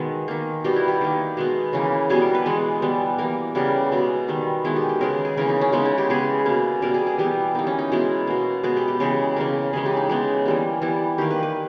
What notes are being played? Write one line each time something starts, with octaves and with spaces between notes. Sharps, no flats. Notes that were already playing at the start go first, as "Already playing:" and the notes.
Already playing: B2 D#3 G#3 B3 B4
D#3 A#3
B2 G3 B3 G4
E4
G4
D#3 A#3
B2 G#3 B3
C#3 E3 A#3
B2 G3 B3 G#4
A#4
B4
E3 G#3 B3 B4
E3 G3 B3
E3 A#3 A#4
C#3 G3 B3 A#4
B2 G#3 B3
D#3 G3 B3
D#3 G#3 B3 E4
G4
G4
C#3 G#3 B3 A#4
G#4
C#3 E3 A#3 A#4
D#4
C#4
C#3 G#3 B3 D#4
E4
G4
C#3 G#3 B3 G#4
B2 A#3
B2 G3 A#3 A#4
G#4
G#4
E3 G3 B3 G4
E3 A#3 D#4
C#4
D#4
B2 G#3 B3 E4
B2 A#3
B2 G#3 B3 G#4
G4
G4
C#3 E3 G#3 G4
C#3 E3 A#3 A#4
C#3 E3 G#3 G#4
G4
D#4
C#3 G#3 B3
E3 G3 A#3
E3 G3 B3 E4
D#3 A#3 G4
B4
B4